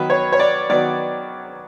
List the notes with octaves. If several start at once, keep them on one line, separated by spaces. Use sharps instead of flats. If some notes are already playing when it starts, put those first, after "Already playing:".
Already playing: D#3 F#3 B3 B4
C#5
C#5
D5
D#3 F#3 B3 D5